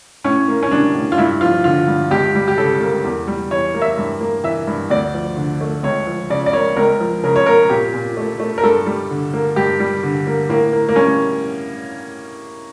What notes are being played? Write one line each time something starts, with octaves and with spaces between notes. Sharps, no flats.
A2 C#4
A#3
C#4
G3 D4
A2
F4
G2 E4
F3 F4
D3 F4
G2
C#2 G4
G3
G4
C#3 A4
A#3
E2
G3
E3 C#5
A#3
E5
G2
A#3
E3 E5
G2
D2 D5
F3
D3
A3
C#2 C#5
F3
C#3 D5
D5
A#3 C#5
C#2 A#4
F3
C#3 A#4
C#5
A#3 A#4
A#2 G4
A#2
A3
A3
A#4
G2 A4
G3
D3
A#3
G2 G4
G3
D3
A#3
A2 A#3
A#3
A#3
G3 C#4